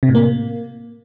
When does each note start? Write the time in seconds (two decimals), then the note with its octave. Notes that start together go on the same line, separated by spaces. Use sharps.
0.03 C3
0.09 A2
0.15 A#3